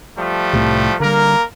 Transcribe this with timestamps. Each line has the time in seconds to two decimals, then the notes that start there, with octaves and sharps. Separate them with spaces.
0.18 F3 G3 A3
0.53 C2 A2 C3
1.00 D3 G3 A#3 A#4